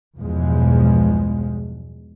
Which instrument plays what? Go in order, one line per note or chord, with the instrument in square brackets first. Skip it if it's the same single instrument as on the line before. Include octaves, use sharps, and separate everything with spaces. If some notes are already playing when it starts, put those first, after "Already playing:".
[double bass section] B1 E2 G2 F3 G#3